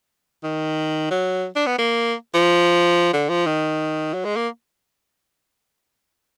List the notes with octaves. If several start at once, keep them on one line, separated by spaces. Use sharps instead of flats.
D#3
F#3
D4
B3
A#3
F3
D3
F3
D#3
F#3
G#3
A#3